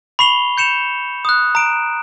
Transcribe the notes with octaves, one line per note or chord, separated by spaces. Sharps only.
B5 C#6 C7 F7 G7
G6 C#7 E7 F7
D#6 F#6
A#5 D7 E7